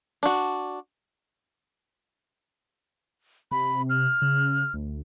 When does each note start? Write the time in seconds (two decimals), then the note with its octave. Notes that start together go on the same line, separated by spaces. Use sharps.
0.23 D4 F#4
3.51 C3 B5
3.90 F6
4.22 C#3
4.74 D2